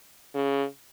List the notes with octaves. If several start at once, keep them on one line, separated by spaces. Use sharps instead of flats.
C#3